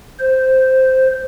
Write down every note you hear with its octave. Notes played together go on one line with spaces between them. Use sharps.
C5